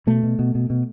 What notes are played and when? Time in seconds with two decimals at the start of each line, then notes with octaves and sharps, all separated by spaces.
0.07 B2 A3
0.23 B2
0.39 B2
0.55 B2
0.70 B2